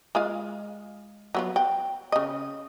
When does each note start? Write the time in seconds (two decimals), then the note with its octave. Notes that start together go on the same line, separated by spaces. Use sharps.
0.15 G#3 F4 F5
1.35 F#3 B3 F4
1.56 F#5 G5
2.12 C#3 D#5